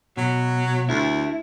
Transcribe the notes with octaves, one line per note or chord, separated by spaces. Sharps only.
B2 F#3
D2 E4